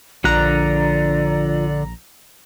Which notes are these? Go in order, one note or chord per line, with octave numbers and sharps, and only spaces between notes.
A#1 D3 F3 D5 A#5 F#6